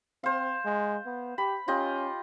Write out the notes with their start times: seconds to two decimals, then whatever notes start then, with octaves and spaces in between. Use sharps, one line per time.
0.24 C4 C5 F5
0.65 G#3
1.06 B3
1.38 G4 B5
1.68 C#4 F4 G4 D#5